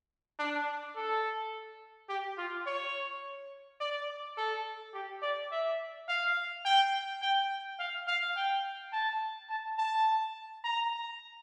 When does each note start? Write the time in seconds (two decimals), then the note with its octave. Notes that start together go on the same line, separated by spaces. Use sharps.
0.39 D4
0.96 A4
2.09 G4
2.38 F4
2.67 C#5
3.80 D5
4.37 A4
4.94 G4
5.22 D5
5.51 E5
6.08 F5
6.65 G5
7.22 G5
7.79 F5
8.08 F5
8.37 G5
8.93 A5
9.50 A5
9.78 A5
10.64 A#5